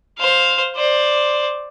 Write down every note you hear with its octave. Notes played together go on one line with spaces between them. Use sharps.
C5 F5
C5 D5